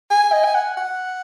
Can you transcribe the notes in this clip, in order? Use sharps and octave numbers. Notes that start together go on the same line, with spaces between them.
G#5
D#5
G#5
F#5
F#5